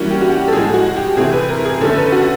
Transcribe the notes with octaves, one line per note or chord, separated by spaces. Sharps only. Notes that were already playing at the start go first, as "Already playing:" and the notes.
Already playing: E3 G3 A#3 C#4 F#4
G4
F#4
G4
A4
A2 F3 G#3 G#4
F#4
G4
C3 E3 A3 C4 G#4
B4
A#4
G#4
D3 F3 A3 C#4 A4
B4
F#4